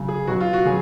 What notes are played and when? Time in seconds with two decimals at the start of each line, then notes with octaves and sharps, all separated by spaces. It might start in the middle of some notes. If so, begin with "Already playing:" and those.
Already playing: C#3 F#3
0.08 G#4
0.27 B2 F#3 F#4
0.40 F4
0.53 F#4
0.65 C#3 F#3 G#4